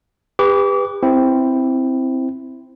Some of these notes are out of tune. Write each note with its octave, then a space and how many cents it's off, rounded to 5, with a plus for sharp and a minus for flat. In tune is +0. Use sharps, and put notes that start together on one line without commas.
G4 +35 B4 +0 D6 -35
C4 +0 E4 +0